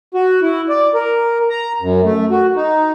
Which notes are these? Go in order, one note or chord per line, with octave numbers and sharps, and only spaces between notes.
F#4
E4
D5
A#4
A#5
F#2
A3
F#4
D#4